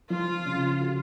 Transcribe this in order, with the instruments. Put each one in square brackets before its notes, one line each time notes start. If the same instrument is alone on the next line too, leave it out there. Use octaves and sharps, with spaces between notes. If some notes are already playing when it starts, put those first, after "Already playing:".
[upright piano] F3 [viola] F4
[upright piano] C#3
F#4